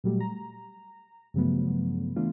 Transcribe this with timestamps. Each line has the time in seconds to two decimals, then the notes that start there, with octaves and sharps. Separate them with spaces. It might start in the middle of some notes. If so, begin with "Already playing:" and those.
0.04 A#2 F#3 G3 A3
0.20 A#5
1.34 G2 C#3 F3 F#3 A3 B3
2.16 E3 A3 B3 D4 F4